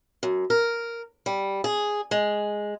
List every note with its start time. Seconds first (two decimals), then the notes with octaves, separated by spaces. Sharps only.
0.23 F#2
0.50 A#4
1.26 G3
1.64 G#4
2.11 G#3